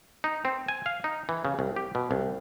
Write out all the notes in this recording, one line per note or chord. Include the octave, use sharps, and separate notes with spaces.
D#4
C4
G#5
F5
D#4
E3
C#3
C2
G4
B2
C2